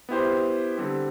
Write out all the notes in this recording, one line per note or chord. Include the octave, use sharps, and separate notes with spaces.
B3 E4 G4 C5
D3 G3 C4